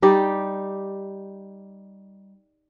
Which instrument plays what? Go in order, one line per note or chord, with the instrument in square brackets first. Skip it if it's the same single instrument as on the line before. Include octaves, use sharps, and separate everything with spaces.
[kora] G3 D#4 G4 D5